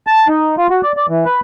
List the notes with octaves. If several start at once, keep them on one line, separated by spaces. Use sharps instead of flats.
A5
D#4
F4
F#4
D5
D5
E3
B4